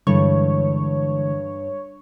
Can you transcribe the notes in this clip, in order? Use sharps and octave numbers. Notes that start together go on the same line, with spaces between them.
G2 D3 E3 G#3 C#5